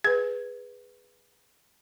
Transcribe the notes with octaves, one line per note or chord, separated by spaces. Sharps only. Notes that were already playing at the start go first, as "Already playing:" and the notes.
G#4 B4 G#6